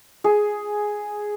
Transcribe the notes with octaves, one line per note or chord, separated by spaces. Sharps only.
G#4